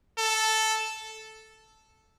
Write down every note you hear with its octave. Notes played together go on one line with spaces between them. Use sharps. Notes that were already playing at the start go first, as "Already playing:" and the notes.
A4